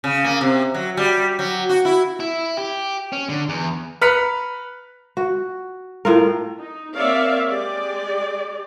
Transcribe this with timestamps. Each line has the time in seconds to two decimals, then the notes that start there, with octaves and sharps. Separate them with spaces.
0.04 C#3
0.24 A#3
0.41 C3
0.75 F#3
0.97 G3
1.39 F#3
1.69 F#4
1.85 E4
2.20 E4
2.57 G4
3.13 C#4
3.29 D3
3.49 E2
4.01 B4 A#5 F6 F#6 B6 C#7
5.17 F#4
6.05 A2 F4 A#4
6.56 D#4
6.96 A#3 C4 C#5 D5 E5 F5
7.47 G#3 G4 G#4 D5